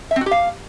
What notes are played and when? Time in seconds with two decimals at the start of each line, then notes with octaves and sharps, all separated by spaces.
0.11 E5
0.16 C4
0.21 F#4
0.26 G4
0.31 F5